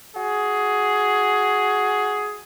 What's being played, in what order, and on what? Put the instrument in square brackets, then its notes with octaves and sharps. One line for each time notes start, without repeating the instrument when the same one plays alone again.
[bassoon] F#4 [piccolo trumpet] G#4